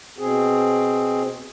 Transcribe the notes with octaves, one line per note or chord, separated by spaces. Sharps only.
B2 C4 G#4